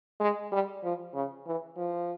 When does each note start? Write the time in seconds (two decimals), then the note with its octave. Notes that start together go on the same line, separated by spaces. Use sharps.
0.20 G#3
0.52 G3
0.84 F3
1.14 C#3
1.47 E3
1.77 F3